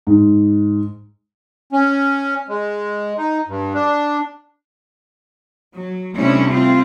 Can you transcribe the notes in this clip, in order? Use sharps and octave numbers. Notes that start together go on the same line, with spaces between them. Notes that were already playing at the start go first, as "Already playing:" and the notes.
G#2
C#4
G#3
D#4
G2
D4
F#3
C3 G3 A3 C#4 D4 E4
C4 E4 F4